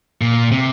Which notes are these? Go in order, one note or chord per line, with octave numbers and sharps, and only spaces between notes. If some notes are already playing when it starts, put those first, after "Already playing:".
A#2
C3